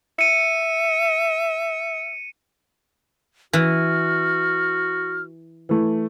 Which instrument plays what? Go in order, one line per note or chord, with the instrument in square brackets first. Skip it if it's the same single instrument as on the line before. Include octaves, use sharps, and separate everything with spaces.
[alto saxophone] E5 [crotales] C#7 D#7
[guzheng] E3 [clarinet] F#4 [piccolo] F6
[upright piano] E3 A3